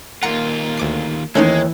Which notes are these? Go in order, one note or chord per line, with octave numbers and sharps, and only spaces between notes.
D#2 A#3 F4 F#5 A#5 C#7
D2 D6 C7
D#2 E3 G#3 A3 C#4 D#4